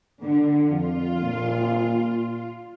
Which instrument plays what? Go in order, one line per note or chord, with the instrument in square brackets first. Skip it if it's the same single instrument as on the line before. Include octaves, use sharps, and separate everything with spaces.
[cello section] D3
[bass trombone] F2 [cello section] F4
[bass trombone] A#2